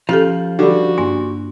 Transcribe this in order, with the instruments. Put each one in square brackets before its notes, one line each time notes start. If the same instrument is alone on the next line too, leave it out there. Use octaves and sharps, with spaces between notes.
[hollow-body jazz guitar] F3 [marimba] C#4 G4 A4
[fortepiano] D3 G3 [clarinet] F#4
[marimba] G2 A#3 D4